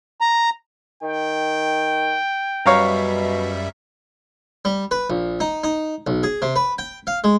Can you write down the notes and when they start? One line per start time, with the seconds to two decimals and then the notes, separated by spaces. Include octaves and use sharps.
0.21 A#5
1.02 D#3 G5
2.66 F#2 B2 G3 C#5 E5 F5 A#5
4.65 G3
4.91 B4
5.10 A#1
5.40 D#4
5.64 D#4
6.07 B1
6.23 G#4
6.42 C3
6.56 B4
6.78 G5
7.07 F5
7.24 G#3